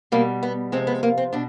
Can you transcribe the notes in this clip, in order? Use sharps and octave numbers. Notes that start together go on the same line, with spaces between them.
B2 G3 A#3
B3
C3 F3 G#3 C4
B3
A#3
C4
B2 D4